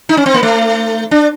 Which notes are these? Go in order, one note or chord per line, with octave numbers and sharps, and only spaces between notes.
D#4
C#4
C4
A#3
A3
D4